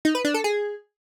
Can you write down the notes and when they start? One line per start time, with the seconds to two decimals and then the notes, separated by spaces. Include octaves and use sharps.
0.05 D#4
0.15 B4
0.25 D4
0.34 A4
0.44 G#4